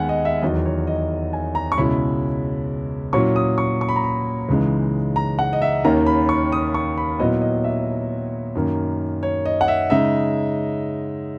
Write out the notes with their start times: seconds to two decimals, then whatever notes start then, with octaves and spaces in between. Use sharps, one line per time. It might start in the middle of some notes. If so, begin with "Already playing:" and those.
Already playing: D#2 D#3 G#3 B3 F#5 G#5
0.09 D#5
0.25 E5
0.42 E2 D#3 F#3 D#5
0.65 C#5
0.87 D#5
1.33 G#5
1.55 A#5
1.72 C#6
1.77 C#2 B2 G#3 C#4 E4 B5
3.13 A#2 F#3 C#4 E4 C#6
3.36 D#6
3.58 C#6
3.81 C#6
3.89 B5
3.96 A#5
4.04 B5
4.49 C#2 C#3 E3 G#3 D#4
5.16 A#5
5.39 F#5
5.53 D#5
5.62 E5
5.84 D#2 D#3 A#3 C#4 A#5
6.06 B5
6.29 C#6
6.52 D#6
6.74 C#6
6.98 B5
7.19 A#2 F#3 B3 E4 D#5
7.41 D#5
7.64 E5
8.55 F#2 D#3 A#3
9.23 C#5
9.46 D#5
9.61 F#5
9.68 E5
9.90 C#3 G#3 D#4 E5